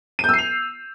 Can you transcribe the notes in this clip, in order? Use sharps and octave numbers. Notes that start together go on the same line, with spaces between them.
E6 G6 C7 D#7 F7